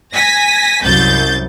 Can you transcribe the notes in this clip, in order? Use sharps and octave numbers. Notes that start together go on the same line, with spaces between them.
G#5 A#6 B6
C2 F#2 G6 A6